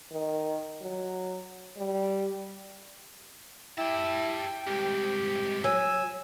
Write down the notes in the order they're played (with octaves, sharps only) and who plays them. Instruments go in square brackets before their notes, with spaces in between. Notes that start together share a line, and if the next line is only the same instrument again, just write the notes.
[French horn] D#3
F#3
G3
[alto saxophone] E4 [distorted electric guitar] G4 A5 [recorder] G5
[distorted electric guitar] C2 G#2 [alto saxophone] G4
[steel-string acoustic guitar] F#3 [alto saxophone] G#5 [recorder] E6